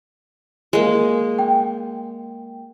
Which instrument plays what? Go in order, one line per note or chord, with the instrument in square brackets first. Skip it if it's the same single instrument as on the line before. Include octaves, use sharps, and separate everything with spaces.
[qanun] G#3 A#3
[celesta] G5